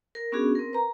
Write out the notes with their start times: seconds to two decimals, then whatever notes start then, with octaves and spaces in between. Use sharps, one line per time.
0.15 A#4
0.32 B3 C#4 D4 F#4 G#4
0.55 C4 A#4
0.73 B4 A#5